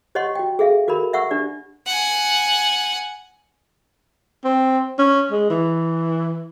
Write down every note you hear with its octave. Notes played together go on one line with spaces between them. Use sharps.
G4 C#5 D#5 F#5 C6 C#6
F#4 G5
G#4 A4 E5 F5
F#4 A4 A#4 B5
E5 F#5 C#6 E6
D4 G4 D5
F#5 G#5
C4
C#4
G#3
E3